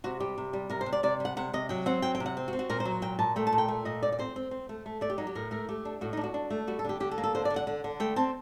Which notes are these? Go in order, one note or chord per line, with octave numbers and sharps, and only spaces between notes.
C3 F#4
G3 G4
C3
G3
C3 A#4
C5
C3
D5
C3 D5
G3 F#5
C3 F#5
C3 D#5
F#3 G5
C4 F#5
F#3 G5
G5
C3
F#5
C4
F#4
C4
F#4
A#2 A#4
C5
F#3
A#2 G5
A#2 A5
A3 G5
A5
A#2
G5
A3
A#2 D#5
D#4 D5
D5
C4 C5
C4
C4
A3
A3
A3 D5
G4
F#3 D#4
G4
A2 A#4
A3 A#4
A3 G4
D4
A2 F#4
D4 D#4
F#4
D4
A3
G3 F#4
A4
D3 G4
D3 G4
A4
A#3
A4
D3 C5
D5
D3
F#5
D3
D3
A3 G5
C4 A5